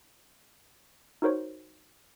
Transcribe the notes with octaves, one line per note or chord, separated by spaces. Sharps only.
D#4 F#4 A#4 C5 C#5